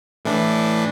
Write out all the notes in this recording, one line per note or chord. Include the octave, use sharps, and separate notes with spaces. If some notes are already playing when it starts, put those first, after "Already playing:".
A2 E3 D4